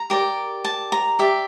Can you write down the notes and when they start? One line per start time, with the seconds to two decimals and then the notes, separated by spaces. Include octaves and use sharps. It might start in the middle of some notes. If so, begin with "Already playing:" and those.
Already playing: A#5
0.10 G4 A#4 D5
0.64 A5
0.92 A#5
1.19 G4 D5 E5